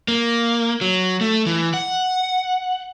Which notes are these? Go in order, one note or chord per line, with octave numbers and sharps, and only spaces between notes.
A#3
F#3
A3
E3
F#5